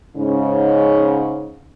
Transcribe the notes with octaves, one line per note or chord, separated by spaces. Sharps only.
G#2 C#3